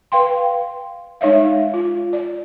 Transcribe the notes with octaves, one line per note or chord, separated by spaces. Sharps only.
B4 F5 G5 C6
G#3 D#4 C#5 E5 F5
F4
D5